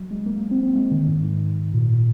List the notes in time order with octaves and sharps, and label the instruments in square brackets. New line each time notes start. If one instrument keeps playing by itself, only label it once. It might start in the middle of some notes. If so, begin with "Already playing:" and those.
Already playing: [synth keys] F#3
G#3
A#3
A#3
C4
C4
G#3
D#3
G#2
G#2
A#2